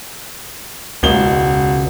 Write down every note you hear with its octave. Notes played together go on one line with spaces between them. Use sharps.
E1 C#2 G7